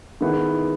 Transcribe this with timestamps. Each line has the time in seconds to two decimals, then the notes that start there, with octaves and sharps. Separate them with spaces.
0.21 D#3 G#3 B3 E4